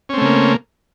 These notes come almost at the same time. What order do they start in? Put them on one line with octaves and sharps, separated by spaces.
C#4 C4 A3 C#3 A#3